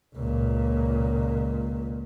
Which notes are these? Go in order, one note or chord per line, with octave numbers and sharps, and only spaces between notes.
C#2 A#2